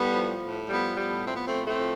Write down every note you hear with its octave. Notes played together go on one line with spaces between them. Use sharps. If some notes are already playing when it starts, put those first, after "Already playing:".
Already playing: A2 G3 B3
F3
A2
F3 G3 B3
A2 G3 B3
F3 C4
B3
A3 C4
A2
A3 C4
F3